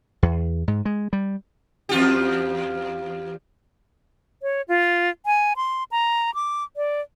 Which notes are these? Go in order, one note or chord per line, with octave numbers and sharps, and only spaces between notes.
E2
G#2
G#3
G3
E2 F4 G4
C#5
F4
G#5
C6
A#5
D6
D5